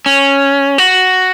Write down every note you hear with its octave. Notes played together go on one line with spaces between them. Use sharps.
C#4
F#4